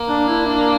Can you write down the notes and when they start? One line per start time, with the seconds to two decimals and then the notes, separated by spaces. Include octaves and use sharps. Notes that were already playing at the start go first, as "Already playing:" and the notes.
Already playing: A#3
0.08 D4
0.28 E4
0.46 D4